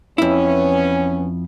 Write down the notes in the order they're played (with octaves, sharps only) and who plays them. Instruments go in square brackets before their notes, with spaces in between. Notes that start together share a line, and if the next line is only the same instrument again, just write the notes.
[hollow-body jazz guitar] F2 E4 [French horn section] E3 B3 C#4